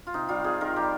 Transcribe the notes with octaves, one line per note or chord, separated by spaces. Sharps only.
F4
C3 D#4
G3 F4
C3 G#4
D#3 A#4
G3 G4